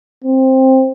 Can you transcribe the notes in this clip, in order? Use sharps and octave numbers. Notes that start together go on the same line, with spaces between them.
C4